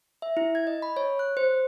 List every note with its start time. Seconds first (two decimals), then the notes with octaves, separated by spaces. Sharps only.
0.22 E5
0.37 E4
0.55 G#6
0.67 D#5
0.82 B5
0.97 C#5
1.19 F#6
1.37 C5